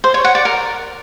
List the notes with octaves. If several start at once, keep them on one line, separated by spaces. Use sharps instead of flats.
C5
C#5
F#5
D5
A#4